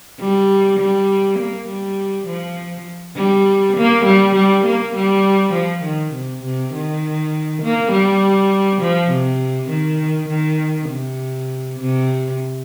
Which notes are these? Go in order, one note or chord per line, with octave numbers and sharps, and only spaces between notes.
G3
G3
A#3
G3
F3
G3
A#3
G3
G3
A#3
G3
F3
D#3
C3
C3
D#3
A#3
G3
F3
C3
D#3
D#3
C3
C3